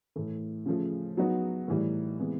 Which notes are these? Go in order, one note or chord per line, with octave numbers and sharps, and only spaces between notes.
A2 E3 A3
C#3 F3 A3
F#3 B3 D#4 F#4
A2 E3 G3
C3 E3 G#3 B3